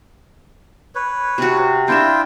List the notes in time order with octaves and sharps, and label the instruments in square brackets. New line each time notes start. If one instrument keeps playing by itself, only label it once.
[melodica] B4 C#5
[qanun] C3 F#4
[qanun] C4 D4 E5 [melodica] E4 F4 G5